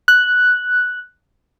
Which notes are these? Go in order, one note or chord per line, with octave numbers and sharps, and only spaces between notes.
F#6